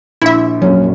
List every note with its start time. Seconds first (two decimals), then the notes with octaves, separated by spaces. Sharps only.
0.22 A#1 E4 E5
0.62 A#1 F#2 F#3 C#4